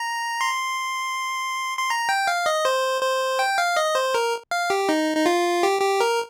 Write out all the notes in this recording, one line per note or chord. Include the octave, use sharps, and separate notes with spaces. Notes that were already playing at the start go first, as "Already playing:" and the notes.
Already playing: A#5
C6
C6
A#5
G5
F5
D#5
C5
C5
G5
F5
D#5
C5
A#4
F5
G4
D#4
D#4
F4
G4
G4
A#4